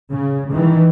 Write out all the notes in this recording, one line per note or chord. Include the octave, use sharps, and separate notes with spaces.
C#3
D#3 E3